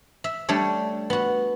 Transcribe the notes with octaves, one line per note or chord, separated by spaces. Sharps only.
E5
G3 A3 D4 C#5
B3 F#4